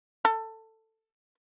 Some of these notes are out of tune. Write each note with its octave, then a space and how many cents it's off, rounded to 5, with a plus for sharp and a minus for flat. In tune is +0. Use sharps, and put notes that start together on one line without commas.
A4 +15